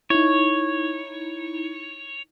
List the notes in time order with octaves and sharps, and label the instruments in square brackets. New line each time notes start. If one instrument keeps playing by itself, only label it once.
[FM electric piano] D#4 E4 [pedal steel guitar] C#5